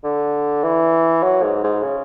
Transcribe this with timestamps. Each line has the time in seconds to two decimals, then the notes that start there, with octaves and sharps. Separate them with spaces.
0.04 D3
0.63 E3
1.23 F#3
1.43 G#2
1.63 G#2
1.83 C#3